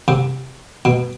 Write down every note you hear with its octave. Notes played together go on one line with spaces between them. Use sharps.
C3
B2